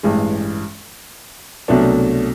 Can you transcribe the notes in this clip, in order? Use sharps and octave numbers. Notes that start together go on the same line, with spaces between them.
A1 G2 E3 G#3
C2 B2 F#3 A3 D4